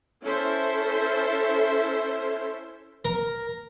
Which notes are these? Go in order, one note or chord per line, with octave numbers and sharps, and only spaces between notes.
C#4 E4 A4 C5 E5
A#4